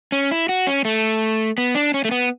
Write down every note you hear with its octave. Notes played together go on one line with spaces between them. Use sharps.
C#4
E4
F#4
C#4
A3
B3
D4
C#4
A3
B3